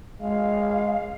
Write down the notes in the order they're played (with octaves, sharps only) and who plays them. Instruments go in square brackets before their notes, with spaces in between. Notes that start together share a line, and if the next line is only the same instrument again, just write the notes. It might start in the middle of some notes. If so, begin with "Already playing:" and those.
[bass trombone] G#3 [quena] F5